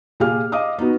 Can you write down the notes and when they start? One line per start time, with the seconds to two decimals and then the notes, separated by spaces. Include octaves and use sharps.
0.20 A#2 G4 G#4 F5 F6
0.52 D#5 F5 D6 D#6
0.78 B3 D#4 F#4